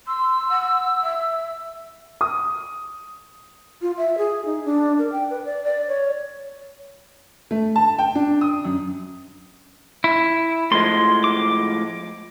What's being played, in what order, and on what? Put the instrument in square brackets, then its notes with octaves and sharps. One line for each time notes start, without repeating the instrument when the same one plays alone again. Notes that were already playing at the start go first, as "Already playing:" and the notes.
[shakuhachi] C6 [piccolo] E6
[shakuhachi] F#5
E5
[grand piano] D#6
[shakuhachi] F4
E5
G#4
D#4
D4
A#4
G5
B4
D5
D5
C#5
[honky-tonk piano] A3
A5
G5
D4
D#6
F#2
[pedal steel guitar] E4
[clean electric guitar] A2 F3 G#3 [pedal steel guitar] C6
[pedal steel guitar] D6